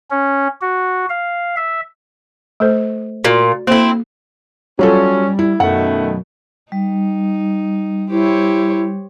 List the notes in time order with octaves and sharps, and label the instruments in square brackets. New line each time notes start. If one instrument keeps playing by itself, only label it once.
[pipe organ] C#4
F#4
F5
E5
[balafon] A3 A4 C5
[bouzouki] A#2 [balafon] F#4
[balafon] A#3 A4 [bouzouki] C4 E4
[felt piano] F#3 F4 A4 [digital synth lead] G3 [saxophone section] C#4
[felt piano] E4
[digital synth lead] F#2 [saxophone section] B2 D#3 A3 [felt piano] F#5
[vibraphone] G3 [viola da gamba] D#4
[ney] E4 [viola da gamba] G4 C5 C#5